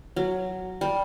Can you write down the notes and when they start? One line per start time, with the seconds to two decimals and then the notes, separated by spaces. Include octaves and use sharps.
0.16 F#3
0.81 G3